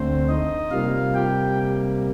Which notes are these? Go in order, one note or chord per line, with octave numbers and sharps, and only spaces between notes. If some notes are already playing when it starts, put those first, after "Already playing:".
Already playing: D2 D3 A3 C4 C5
D#4 D#5
C3 G3 A#3 F4 F5
G4 G5